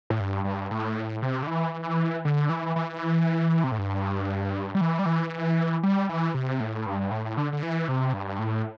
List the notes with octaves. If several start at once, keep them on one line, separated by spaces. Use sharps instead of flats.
A2
G2
G2
A2
C3
D3
E3
D3
E3
E3
C3
A2
G2
G3
E3
G3
E3
G3
E3
C3
A2
G2
A2
D3
D3
E3
C3
G2
A2